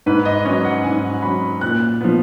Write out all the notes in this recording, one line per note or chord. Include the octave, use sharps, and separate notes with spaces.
G#2 B4
D#5
F#3 C#4 D#5
F#5
G#2 G#5
F#3 C#4 B5
A#2 F#6
F3 B3